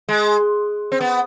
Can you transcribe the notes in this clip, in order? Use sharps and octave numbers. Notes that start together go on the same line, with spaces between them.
G#3
C4
B3